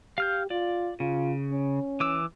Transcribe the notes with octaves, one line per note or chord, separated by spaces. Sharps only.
G4 F5 F6 G6
F4 D5
C#3 F4
C#4
E3 D6 E6